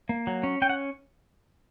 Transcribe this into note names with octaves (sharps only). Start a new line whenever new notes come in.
A#3
F#3
C#4
C#4 G5
F#5